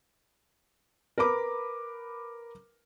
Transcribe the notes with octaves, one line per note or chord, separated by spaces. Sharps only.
A#4 B4 B5 D6